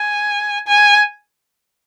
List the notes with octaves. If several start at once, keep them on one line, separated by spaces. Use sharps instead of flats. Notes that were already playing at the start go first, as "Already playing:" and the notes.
Already playing: G#5
G#5